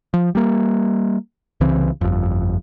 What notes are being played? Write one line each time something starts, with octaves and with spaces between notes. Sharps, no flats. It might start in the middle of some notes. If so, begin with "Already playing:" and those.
F3
G3 A#3
C2 C#3 E3 C4
G1 F2